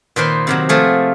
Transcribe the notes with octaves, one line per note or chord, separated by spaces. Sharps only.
A#2 D#3 B4 C5 C6
C3 D#3 F#3
F3 A3 G#4